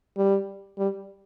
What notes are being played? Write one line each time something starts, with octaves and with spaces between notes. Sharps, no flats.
G3
G3